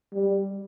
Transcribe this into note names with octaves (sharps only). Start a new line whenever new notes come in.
G3